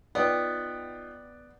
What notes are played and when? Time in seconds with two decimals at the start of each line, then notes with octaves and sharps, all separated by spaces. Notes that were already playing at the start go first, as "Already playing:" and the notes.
0.15 B3 D#4 F4 D5 G5